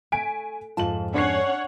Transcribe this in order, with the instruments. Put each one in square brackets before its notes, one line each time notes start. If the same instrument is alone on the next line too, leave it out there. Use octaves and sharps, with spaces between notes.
[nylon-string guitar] A3 [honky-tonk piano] G#5 B6 D7
[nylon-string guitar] F2 G#2 A5 [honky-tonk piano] F4 F#7
[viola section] C#4 C#5 F#5 [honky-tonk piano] D4 C7